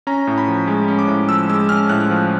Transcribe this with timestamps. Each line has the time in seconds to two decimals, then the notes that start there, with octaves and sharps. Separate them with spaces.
0.07 C#4 A#5
0.27 A2
0.38 B5
0.48 F3
0.67 G#3
0.88 C#4
0.99 D6
1.08 A2
1.29 F3 E6
1.49 G#3 E6
1.69 C#4 F6
1.89 A2 F#6
2.10 F3